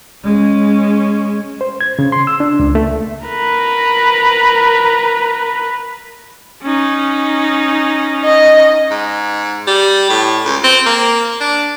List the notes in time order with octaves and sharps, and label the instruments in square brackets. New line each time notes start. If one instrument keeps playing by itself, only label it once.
[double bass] G#3 C#4
[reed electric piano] C5
G#6
C#3
C6
E6
D4
C#2
A3
[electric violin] A#4 B4
C#4 D#4
[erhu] D#5
[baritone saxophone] G#2
G3
A2
C#2
C4
A#3
D4